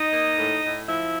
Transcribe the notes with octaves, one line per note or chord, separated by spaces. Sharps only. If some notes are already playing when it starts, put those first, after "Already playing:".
Already playing: D#4 D#5
A#3
A2
A2
F3 E4 E5